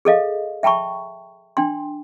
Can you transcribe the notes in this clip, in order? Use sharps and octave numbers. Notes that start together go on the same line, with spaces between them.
G#4 A4 D#5 F5
E5 G5 A5 B5 C#6
D4 G5 C6